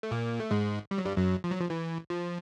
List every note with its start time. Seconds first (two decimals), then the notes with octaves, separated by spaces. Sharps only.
0.03 A3
0.11 A#2 A#3
0.40 A3
0.51 G#2 G#3
0.91 G3
0.98 F#3
1.05 G2 G3
1.17 F#2 F#3
1.44 F3
1.51 F#3
1.59 F3
1.70 E3
2.10 F3